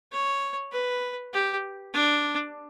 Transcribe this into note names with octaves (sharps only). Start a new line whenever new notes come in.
C#5
B4
G4
D4